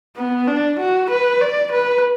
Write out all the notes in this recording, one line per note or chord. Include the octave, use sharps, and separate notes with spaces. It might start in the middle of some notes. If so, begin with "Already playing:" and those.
B3
D4
F#4
B4
D5
B4